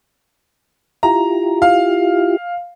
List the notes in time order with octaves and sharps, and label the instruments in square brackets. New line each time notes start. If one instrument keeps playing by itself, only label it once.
[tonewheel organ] E4 F4 G4 [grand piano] A#5
[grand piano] F5